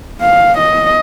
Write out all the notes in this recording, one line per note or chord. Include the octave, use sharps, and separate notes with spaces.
F5
D#5